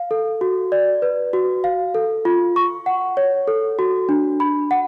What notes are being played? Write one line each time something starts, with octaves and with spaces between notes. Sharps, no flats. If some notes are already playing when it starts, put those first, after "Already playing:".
Already playing: F5
A4
F#4
D5
B4
F#4
F5
A4
F4
C#6
F#5
C#5
A4
F#4
D4
B5
F#5